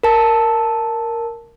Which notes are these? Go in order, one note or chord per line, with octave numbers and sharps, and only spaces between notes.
A#4 A5